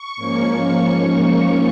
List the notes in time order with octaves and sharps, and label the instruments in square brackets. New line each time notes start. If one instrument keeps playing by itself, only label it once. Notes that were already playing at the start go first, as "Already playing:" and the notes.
Already playing: [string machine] C#6
G#2 F3 A#3 C#4